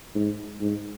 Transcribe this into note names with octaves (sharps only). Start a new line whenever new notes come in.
G#2
G#2